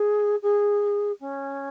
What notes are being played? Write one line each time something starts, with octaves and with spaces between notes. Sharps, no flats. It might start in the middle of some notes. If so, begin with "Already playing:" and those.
Already playing: G#4
G#4
C#4